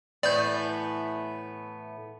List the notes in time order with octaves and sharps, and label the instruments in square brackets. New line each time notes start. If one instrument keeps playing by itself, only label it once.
[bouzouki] A2 E3 A3 [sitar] B3 [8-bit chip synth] D5 G6